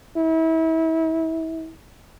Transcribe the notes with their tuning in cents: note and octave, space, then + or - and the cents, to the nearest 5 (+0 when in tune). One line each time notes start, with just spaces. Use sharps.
E4 -30